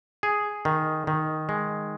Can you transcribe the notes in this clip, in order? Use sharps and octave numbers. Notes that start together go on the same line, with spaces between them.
G#4
D#3
D#3
G#3